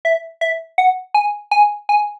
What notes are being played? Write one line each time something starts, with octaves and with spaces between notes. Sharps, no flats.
E5
E5
F#5
G#5
G#5
G#5